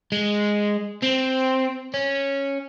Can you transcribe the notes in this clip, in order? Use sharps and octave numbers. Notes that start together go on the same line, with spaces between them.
G#3
C4
C#4